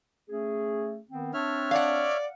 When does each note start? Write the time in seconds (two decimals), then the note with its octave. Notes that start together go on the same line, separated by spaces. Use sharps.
0.29 A3 C#4 G#4
1.09 D#3 B3 C4
1.34 C4 D4 C#5 E5 F6
1.71 D5 F5 F#5